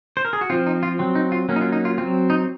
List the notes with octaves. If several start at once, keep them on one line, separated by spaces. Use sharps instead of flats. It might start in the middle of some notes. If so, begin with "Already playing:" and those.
C5
A#4
G#4
F#4
F3 C4 F4
D#4
F4
F#3 C4
D#4
F4
F#3 A#3 C#4
D#4
F4
D#4
F4
F#3 C4 F4
D#4